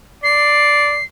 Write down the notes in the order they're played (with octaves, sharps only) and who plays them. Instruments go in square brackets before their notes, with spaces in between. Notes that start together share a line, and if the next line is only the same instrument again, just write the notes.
[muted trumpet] D5 [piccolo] C7